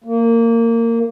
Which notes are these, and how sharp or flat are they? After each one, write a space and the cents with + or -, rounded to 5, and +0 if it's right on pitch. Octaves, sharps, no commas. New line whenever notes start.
A#3 -20